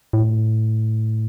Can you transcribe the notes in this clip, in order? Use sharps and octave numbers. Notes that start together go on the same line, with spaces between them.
A2